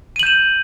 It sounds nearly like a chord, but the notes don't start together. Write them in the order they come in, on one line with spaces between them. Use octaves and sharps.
D#7 F#7 G6 E7